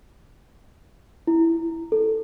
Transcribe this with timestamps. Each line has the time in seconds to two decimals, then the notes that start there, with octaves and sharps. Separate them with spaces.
1.27 E4
1.92 A4